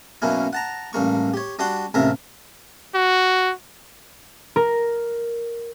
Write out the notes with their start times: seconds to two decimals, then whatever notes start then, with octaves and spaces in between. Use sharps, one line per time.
0.22 F#2 B2 A#3 C#4 E4
0.53 F#5 A5 A#5
0.93 A1 G2 A#3 C#6
1.34 G4 C#5
1.59 G3 D4 F#4 F#5 G5 C6
1.94 A1 D#2 C3 A#4 E5 F5
2.94 F#4
4.56 A#4